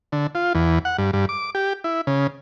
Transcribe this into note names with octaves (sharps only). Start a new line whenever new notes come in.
D3
F4
E2
F#5
G2
G2
D6
G4
E4
C#3